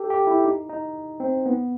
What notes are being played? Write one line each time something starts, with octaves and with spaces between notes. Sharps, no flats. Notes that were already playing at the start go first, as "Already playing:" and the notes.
Already playing: G4 A4
G4
E4
D#4
D#4
C4
B3